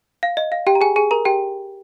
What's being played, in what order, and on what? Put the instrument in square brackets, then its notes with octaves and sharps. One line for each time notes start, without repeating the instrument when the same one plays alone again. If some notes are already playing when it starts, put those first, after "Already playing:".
[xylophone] F5
D#5
F5
G4 G5
A#5
G#4 G#5
G#4 G#5
A#4 A#5
G4 G5